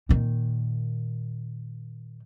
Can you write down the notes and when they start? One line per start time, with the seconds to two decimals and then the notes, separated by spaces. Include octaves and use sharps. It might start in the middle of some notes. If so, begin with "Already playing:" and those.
0.09 A#2 D#3